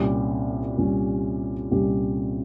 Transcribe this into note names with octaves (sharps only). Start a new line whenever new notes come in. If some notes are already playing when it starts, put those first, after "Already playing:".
Already playing: C2 A#2 G3 C#4 G4
C2 A#2 G3 C#4 G4
C2 A#2 G3 C#4 G4